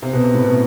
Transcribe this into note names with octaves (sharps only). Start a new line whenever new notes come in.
C3
B2
C3
A2
B2